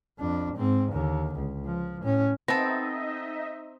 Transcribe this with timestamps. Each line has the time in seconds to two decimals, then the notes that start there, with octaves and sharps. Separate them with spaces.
0.19 F2 D4
0.55 G#2 C4
0.92 D#2 D3
1.35 C#2
1.65 F3
2.03 A2 C#4
2.48 B3 C4 D#4 A4 D#5 E5 A#6